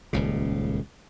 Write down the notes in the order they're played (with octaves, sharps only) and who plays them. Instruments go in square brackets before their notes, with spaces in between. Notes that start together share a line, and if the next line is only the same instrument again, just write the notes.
[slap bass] D#1 C#2 C#3